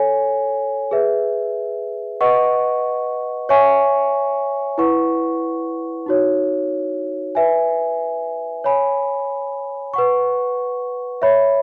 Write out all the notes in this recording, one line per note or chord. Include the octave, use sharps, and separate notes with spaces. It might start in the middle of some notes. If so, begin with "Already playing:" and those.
Already playing: A4 C#5 G#5
G#4 B4 E5
B4 D#5 F#5 C#6
C#5 E5 G#5 C#6
E4 B4 F#5 C#6
D#4 F#4 C#5
B4 E5 G#5
C#5 G#5 B5
B4 F#5 C#6
C#5 E5 B5